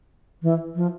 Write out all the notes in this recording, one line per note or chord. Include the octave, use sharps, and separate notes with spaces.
E3
F3